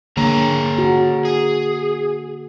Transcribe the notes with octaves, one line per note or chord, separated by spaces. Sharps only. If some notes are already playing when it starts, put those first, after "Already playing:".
D3 A#3 G#4 C#5 A#5
F#4
G#4